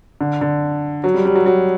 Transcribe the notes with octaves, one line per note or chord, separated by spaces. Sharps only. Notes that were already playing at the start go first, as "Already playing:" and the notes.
D3
D3
F#3
G3
G3
F#3
F#3